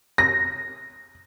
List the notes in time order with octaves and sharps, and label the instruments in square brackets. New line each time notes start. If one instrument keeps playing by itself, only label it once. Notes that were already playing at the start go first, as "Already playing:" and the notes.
[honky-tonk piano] A#6